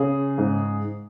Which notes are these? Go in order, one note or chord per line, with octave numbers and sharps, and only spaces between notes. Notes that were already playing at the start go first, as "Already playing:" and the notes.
Already playing: C#3 G#4
G#2